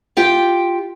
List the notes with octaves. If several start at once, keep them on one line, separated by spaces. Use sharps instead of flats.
F4 G4 G5